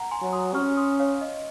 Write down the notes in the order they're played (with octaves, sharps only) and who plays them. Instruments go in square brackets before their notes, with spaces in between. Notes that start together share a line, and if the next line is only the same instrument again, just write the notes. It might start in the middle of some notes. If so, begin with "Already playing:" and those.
Already playing: [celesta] F#5 A#5
G#5 C6
[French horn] F#3
[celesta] C6 D#6
[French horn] C#4 [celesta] C#6 F6
[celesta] C6 D#6
C#5 F5
D#5